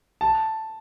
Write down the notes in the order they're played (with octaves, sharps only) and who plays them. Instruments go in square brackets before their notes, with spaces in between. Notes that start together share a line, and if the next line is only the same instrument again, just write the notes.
[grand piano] A5